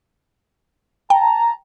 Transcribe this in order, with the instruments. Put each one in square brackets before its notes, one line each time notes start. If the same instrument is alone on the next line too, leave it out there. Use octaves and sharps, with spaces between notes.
[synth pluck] G5 [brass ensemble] A5 A#5